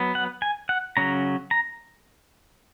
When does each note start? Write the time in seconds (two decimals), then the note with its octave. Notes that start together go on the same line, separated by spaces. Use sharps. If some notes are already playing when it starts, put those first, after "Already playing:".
Already playing: F#3 B3
0.15 F#5
0.42 G#5
0.69 F#5
0.97 C#3 F#3 C#4 A#5
1.51 A#5